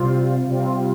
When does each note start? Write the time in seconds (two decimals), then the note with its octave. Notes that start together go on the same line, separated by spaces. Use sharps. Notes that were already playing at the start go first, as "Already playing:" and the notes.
Already playing: C3 G3 C4 F4
0.46 C3 G3 C4 F4